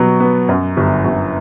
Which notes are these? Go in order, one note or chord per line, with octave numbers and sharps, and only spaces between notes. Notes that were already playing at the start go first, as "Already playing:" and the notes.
Already playing: B2 F#3 B3
B3
F#2
G1
G1